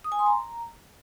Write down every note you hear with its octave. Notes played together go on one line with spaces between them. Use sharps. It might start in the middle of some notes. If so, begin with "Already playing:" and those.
D#6
G#5
C6
A#5